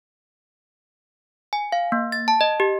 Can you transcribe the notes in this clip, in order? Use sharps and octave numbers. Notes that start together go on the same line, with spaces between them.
G#5
F5
A#3
A6
A5
D#5
G4